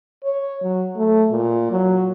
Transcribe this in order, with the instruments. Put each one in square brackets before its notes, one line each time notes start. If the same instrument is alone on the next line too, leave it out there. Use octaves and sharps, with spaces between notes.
[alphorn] C#5
F#3
A3
A#2
F#3